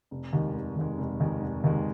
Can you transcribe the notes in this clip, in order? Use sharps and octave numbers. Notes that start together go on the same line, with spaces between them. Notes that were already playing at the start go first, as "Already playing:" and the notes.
F1
D#2 D#3 G#3
F1
D#2 D#3 G#3
F1
D#2 D#3 G#3
F1
D#2 D#3 G#3